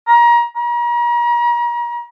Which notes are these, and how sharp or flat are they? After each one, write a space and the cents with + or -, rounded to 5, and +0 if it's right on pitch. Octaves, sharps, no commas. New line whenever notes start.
A#5 +30
A#5 +40